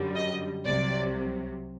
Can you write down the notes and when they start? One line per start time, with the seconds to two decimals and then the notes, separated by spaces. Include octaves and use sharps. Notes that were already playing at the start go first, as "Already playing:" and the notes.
Already playing: F#2 D3 G3
0.15 D#5
0.65 C2 C3 F#3 D5